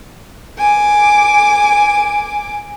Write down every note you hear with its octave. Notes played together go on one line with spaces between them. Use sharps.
G#5 D6